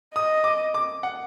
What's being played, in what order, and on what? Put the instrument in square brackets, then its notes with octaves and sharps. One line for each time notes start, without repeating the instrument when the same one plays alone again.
[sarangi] D#5 [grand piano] D#6
[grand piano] D6
D6
F#5